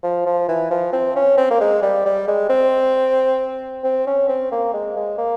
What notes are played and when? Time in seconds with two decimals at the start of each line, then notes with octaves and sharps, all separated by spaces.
0.03 F3
0.26 F3
0.48 E3
0.71 F3
0.92 C4
1.16 C#4
1.37 C4
1.50 A#3
1.61 G#3
1.82 G3
2.05 G3
2.28 G#3
2.49 C4
3.84 C4
4.07 C#4
4.28 C4
4.52 A#3
4.74 G#3
4.96 G#3
5.18 A#3